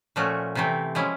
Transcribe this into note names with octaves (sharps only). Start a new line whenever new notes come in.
A#2 F3 A3 C#4 F#4
C3 E3 A3 C4
F3 G#3 C#4 E4